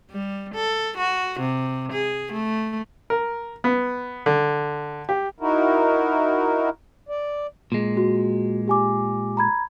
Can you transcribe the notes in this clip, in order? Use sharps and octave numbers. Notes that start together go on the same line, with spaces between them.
G3
A4
F#4
C3
G#4
A3
A#4
B3
D3
G4
D#4 E4 F#4 A#4
D5
A#2 G#3
F#4
G4 G#5 D6
A#5 B5 G#6